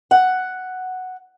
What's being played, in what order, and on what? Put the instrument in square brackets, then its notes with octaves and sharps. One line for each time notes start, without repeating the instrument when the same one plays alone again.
[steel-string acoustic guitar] F#5